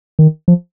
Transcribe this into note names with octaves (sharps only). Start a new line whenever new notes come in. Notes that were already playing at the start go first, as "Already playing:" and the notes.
D#3
F3